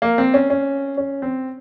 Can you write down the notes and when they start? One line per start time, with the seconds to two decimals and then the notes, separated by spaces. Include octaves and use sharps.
0.02 A#3
0.18 C4
0.34 C#4
0.50 C#4
0.97 C#4
1.22 C4